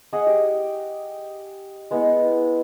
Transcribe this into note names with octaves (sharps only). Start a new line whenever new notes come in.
G#4 D#5 F#5
G4
G#3 B3 E4 F#5